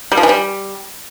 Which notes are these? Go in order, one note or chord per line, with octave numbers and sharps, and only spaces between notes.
G3
F3
E3
G3